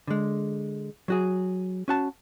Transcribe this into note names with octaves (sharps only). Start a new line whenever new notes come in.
D3 G#3
F#3 F#4 G#4
C#4 F#4 A5